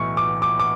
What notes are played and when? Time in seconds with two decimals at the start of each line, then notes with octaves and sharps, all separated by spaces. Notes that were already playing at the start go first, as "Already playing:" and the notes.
Already playing: B1 A2 E3 C#6
0.17 D6
0.42 D6
0.60 D6